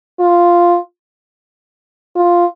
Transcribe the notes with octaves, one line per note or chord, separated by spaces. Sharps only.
F4
F4